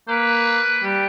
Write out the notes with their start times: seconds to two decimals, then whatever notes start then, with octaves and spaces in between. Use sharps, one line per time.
0.08 A#3 B4
0.83 G3